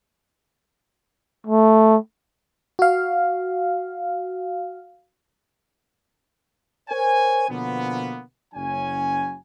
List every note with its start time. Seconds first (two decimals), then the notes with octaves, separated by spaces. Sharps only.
1.47 A3
2.79 F#4 F5
6.90 A#4 C5 C#5 G#5
7.50 B2 D3 F3 A#3 B3
8.55 F#1 F#3 C#4 G#5